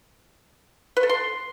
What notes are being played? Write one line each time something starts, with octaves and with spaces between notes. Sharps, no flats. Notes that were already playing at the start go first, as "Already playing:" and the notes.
B4
A4
C6